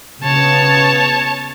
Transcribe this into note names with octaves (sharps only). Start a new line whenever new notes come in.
C#3 B3 C#5 A5